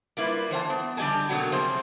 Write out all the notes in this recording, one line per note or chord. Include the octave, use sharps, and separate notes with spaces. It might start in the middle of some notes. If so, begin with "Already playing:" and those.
G3 A#3 E4 F4 B4
E3 C5 F5 A5
B3
D3 G3 G4 D#5 G#5 A5
B2 D3 F#3 A#3 C4 F#4
C3 F3 G3 C4 G#4 C5